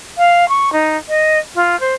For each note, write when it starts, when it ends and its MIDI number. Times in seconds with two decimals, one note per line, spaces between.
0.17 0.48 77
0.48 0.72 85
0.72 0.96 63
1.08 1.38 75
1.55 1.78 65
1.79 1.94 72